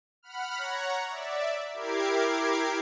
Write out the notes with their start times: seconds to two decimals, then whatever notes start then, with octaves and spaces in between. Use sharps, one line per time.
0.23 F#5 B5 F6
0.57 C#5 F#5 A#5
1.09 D5 E5
1.73 E4 G4 A#4 D6 G#6 C7